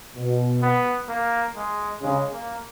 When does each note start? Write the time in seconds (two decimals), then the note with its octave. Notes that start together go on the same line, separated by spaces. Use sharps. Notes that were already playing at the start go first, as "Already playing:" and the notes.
0.16 B2
0.62 B3
1.09 A#3
1.56 G#3
2.02 C#3 G#3
2.33 A#3